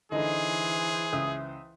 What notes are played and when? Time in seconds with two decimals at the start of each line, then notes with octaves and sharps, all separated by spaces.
0.12 D3 E3 D#4 G#4 C5 D#5
1.13 C#2 E5 D#6